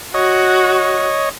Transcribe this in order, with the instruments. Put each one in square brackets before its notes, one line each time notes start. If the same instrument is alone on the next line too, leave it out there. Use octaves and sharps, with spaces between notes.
[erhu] F#4 [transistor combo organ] C#5 D#5